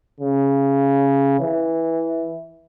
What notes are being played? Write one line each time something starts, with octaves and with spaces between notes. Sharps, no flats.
C#3
E3